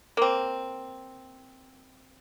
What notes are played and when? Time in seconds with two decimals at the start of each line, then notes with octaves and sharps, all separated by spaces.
0.17 A#3 C4